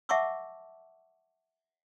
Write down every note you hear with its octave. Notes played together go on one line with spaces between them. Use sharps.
E5 F#5 A5 C#6 D6 E6